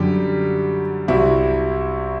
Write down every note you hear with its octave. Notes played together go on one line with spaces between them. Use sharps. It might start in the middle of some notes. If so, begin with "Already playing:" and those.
Already playing: F#2 D3 G3 G4
C2 C3 F#3 E4